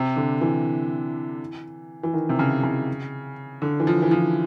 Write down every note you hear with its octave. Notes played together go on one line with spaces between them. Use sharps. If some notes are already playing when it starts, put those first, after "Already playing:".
Already playing: C3
D3
E3
E3
D#3
C3
C#3
C#3
D3
E3
F3
E3
F3